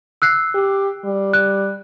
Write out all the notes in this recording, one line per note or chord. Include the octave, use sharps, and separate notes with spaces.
E6 F#6 C7
G4
G3
F#6